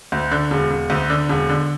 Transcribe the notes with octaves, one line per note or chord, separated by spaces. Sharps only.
D2
D3
E1
E1
D2
D3
E1
D3